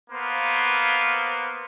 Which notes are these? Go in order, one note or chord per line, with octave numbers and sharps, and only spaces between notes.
A#3 B3 C5 F5